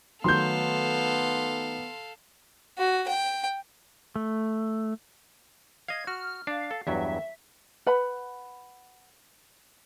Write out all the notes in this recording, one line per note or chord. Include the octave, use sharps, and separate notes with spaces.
D#3 F#3 A3 B3 A4 F5 C6 G6
F#4
G5
A3
D#5 F5 G#6
F#4 F6
D4 F5
A4
E2 G2 F#3 E5
B4 F#5 B5